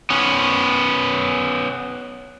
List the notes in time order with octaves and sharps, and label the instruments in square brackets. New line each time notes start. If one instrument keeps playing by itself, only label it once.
[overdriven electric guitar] B3 C#4